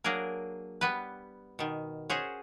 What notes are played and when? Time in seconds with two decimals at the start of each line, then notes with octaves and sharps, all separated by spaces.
0.04 F#3 A#3 D4 G#4 A#4
0.81 G3 B3 B4
1.59 B2 D#3
2.10 C#4 F#4 G#4 C5